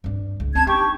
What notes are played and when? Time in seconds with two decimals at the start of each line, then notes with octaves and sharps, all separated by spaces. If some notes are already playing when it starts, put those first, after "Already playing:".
0.04 G2 D4
0.40 C#2
0.55 C4 C#4 A5 G#6
0.67 D4 D#4 G4 C#6